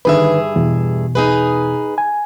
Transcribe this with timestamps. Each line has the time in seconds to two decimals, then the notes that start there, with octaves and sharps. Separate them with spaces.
0.05 G2 D3 D#3 G#4 B4 E5
0.56 E2 B2
1.15 D#4 G#4 B4
1.98 G#5